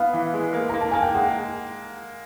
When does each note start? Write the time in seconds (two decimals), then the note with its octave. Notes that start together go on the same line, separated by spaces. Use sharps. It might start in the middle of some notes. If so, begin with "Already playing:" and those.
Already playing: B3 F5
0.14 E3
0.34 G#3
0.53 A#3
0.69 A#3 A#5
0.81 A5
0.91 A#3 G#5
1.02 G5
1.14 G#3 F#5